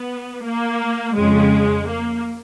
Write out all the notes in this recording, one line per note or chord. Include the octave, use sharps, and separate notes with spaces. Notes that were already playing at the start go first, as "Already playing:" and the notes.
Already playing: B3
A#3
F2 C#3 G#3
A#3